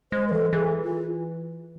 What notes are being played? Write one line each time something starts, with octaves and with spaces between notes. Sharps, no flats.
G#3 C5
B4
E3 A4
E3 G#4
F4